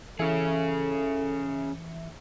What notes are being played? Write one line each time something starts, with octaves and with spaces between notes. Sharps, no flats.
E3 C#4 G#4 A4 E5 C#7